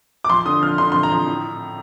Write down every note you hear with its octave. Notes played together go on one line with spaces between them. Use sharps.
D6
F3 C6
D3 D#6
F3 F6
D3 C6
F3 C6
A#5
F3
A2